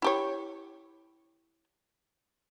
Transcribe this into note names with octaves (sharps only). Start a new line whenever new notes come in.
E4 G4 C#5